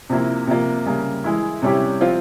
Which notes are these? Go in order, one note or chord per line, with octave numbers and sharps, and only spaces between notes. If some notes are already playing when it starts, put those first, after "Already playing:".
C3 F3 A#3 E4
C3 F3 A#3 F4
C#3 G3 A#3
E3 G#3 E4
C3 G3 C#4 E4 G4
F3 C4 F4